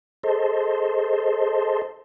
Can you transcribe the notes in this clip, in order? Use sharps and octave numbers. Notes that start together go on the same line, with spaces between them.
G#4 A4 C5 D#5 A5 C6